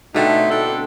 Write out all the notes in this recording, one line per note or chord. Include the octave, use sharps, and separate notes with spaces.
B2 D3 A3 C4 D#4
D4 E4 A4